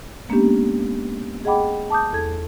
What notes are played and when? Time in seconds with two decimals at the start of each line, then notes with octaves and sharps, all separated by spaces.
0.29 G#3 A#3 B3 C#4 D4 G4
1.45 G#4 D#5 F#5 G5 B5 D6
1.90 A5 D6 D#6 G6
2.13 E2 A4 G#6